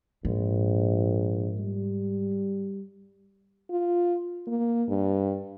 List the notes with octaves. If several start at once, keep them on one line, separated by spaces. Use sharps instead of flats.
A#1 G#2
G3
F4
A#3
G2